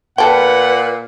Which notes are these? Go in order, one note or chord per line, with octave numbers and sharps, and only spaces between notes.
A#2 A4 B4 F#5 G5